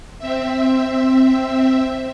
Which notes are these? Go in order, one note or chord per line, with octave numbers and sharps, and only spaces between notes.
C4 E5